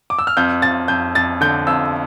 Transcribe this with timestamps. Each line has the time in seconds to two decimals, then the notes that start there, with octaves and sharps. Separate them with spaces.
0.10 D6
0.19 E6
0.27 F6
0.37 F2 G6
0.62 F2 A6
0.88 F2 G6
1.15 F2 A6
1.41 D3 G6
1.67 F2 E6